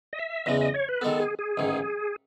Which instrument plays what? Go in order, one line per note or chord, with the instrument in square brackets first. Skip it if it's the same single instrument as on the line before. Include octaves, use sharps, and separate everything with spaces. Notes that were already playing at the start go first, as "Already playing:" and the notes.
[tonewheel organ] D#5
E5
[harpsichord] E2 C#3 G#3 [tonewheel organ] D#5
[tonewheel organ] D#5
C#5
B4
[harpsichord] D#3 G#3 B3 [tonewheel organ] A4
[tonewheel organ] G#4
G#4
[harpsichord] A1 G#2 D#3